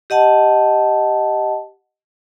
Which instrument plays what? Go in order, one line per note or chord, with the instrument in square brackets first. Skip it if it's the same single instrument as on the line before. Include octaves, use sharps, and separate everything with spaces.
[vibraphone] G4 D#5 F#5 A5